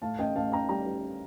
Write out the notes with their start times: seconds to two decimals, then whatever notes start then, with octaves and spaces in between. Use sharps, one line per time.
0.02 A2 F5 A5
0.19 A1 D#5 G5
0.36 A1 F5 A5
0.52 A1 G5 A#5
0.69 G3 G5 A#5
0.86 G3